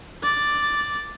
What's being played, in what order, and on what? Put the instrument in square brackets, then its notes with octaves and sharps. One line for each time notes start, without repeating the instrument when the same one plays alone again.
[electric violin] D5